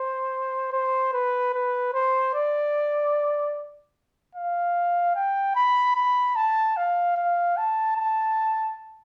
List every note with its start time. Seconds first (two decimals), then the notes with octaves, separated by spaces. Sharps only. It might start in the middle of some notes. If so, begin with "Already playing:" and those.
Already playing: C5
0.73 C5
1.13 B4
1.54 B4
1.94 C5
2.34 D5
4.35 F5
5.16 G5
5.56 B5
5.96 B5
6.36 A5
6.77 F5
7.16 F5
7.57 A5
7.97 A5